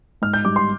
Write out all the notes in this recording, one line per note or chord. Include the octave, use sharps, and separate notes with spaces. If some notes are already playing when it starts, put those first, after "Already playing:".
G#2 F6
G6
G3 D6
C6